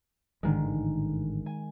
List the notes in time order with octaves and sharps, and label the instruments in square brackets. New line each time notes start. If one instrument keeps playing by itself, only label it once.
[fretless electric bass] A1 G#2 D3 [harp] D#3 G#3
[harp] G#5